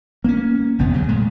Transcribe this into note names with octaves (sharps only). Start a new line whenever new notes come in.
A#3 C#4
G1 E2 C3 B3
D2 C#3 F#3
A#2 G#3 A3